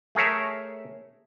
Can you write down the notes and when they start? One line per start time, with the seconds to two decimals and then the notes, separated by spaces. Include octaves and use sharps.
0.15 A3 G#4 A#4 C#5 E5